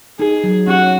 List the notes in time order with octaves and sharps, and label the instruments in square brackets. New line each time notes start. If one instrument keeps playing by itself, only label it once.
[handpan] D#4 [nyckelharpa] G#4
[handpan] F#3
[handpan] C#4 [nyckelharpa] F#4